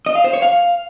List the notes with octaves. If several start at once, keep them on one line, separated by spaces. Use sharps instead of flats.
D#5
F5
C5
C#5
F5